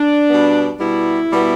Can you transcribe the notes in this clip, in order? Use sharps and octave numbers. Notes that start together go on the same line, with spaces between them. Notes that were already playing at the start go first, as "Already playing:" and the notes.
Already playing: D4
B2 G3 B3
B2 G3 B3 E4
B2 G3 B3